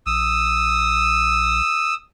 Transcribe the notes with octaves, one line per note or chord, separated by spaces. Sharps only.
A#1 D#6 E6